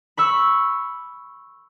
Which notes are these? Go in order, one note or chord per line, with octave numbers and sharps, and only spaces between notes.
B5 C#6 E6